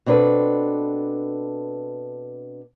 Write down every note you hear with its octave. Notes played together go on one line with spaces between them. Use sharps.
B2 C4 D4 A4 B4